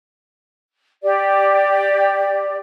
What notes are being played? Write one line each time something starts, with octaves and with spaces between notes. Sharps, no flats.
G4 D5